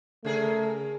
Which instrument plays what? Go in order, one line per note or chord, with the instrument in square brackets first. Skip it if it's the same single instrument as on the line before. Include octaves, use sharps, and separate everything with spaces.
[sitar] C#3 G#4 A#4 [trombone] A3